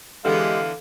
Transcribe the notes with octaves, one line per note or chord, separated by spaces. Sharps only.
D3 E3 G#3 B3 G4 A4 F5